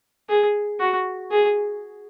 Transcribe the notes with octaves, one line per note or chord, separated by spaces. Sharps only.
G#4
F#4
G#4